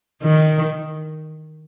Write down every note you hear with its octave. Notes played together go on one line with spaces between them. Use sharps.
D#3